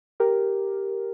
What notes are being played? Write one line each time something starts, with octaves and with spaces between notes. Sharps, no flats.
G4 A#4